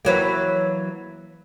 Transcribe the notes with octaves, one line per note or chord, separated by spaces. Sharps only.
E3 F#3 A#3